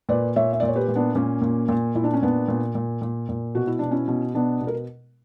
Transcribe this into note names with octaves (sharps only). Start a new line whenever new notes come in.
A#2 B4 D5
A#2 C#5 E5
E5
A#2 D5
C#5
G4 B4
A#2
B3 D4
A#2 A#3 C#4
A#2
A#2
A#2 E4
D4
C#4
A#2 B3 D4
A#2
A#2
A#2
A#2
B2 F#4
E4
B2 D4
C#4 E4
B2
B2 B3 D4
B2
A#4